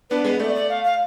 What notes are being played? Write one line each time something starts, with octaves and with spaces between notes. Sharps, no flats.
B3 D4 B4
G#3 B3
A3 D5
D5
F5
F5